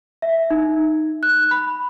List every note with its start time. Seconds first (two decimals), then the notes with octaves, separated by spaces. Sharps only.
0.22 E5
0.50 D#4
1.23 F#6
1.51 B5